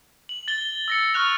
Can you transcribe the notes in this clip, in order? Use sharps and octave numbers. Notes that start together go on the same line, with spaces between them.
F#7
A6 G7
E6 A#6 C#7
C#6 F6 F#6 F7